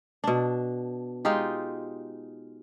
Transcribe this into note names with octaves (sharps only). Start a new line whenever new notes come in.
B2 D4
G#3 D#4 F4 G4